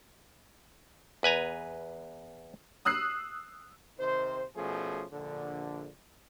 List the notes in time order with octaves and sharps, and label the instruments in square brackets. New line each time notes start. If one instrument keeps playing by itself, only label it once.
[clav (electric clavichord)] E2 B4 G#5 A#5
[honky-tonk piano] D#6 E6 F#6 C7
[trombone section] C3 D#3 C5
B2 F3 A3 C#4 G#4
A#1 D3